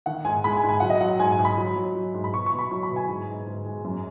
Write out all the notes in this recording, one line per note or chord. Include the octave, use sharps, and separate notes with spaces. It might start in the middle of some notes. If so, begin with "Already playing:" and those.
D#3 F#5
G#2 G#5
G#3 B5
G#5
G#2
G#5
F#3 F#5
D#5
F#3 F#5
G#2 G#5
G#5
G#2
B5
F#3
F#3
F#3
G#2
B5
B2 C#6
C#6
B2
B5
F#3 C#6
B5
B2
G#5
G#2
G#2
G#2
G#3
F#2